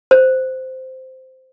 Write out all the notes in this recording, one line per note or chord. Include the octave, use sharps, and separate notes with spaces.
C5